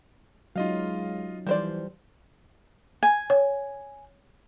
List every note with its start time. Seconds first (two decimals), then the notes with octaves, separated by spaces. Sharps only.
0.56 F#3 G#3 C#4 D#4 F4 D#5 F5
1.47 E3 F3 G3 C5 D5
3.03 G#5
3.30 C#5